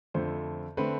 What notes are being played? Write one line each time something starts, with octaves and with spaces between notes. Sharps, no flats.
F2 D3 A3 C5
D3 A3 C4 B4